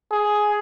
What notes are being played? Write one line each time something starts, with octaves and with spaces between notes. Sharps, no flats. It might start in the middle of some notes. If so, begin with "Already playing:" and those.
G#4